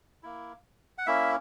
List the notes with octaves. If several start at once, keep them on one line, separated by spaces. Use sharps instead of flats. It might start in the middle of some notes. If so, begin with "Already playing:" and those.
A#3 E4
F#5
A#3 C#4 E4 E5